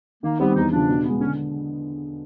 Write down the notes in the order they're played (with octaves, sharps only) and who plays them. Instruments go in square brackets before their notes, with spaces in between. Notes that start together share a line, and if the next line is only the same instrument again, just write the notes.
[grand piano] D#3 [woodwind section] A#3
[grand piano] G3 C4 D#4 G4 [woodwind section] B3
[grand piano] E2 [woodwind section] D#4
[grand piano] C#3 F3 [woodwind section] D4
[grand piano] B2
G#3 B3
[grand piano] D3 [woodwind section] C#4